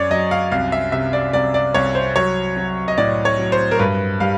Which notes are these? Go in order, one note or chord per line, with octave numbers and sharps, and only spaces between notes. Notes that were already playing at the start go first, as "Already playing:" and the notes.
Already playing: F#2 F#3 C#5 D5
F#3 D#5
F5
C2 F5
E5
C3 E5
D5
C2 D5
D5
C2 C#5
C5
F#3 C#5
F#3
D#5
A2 D5
C#5
F#3
C5
A#4
G2 B4
G3 F5